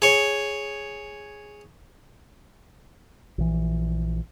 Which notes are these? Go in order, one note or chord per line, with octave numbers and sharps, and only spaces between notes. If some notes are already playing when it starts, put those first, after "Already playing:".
G#4 C#5
A#1 E3